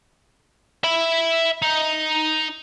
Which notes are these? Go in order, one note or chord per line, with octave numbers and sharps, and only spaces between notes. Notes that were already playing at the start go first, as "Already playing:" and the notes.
E5 B5
D#4